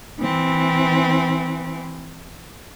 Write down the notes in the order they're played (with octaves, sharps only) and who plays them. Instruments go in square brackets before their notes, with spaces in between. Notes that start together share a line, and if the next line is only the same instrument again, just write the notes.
[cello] E3 C4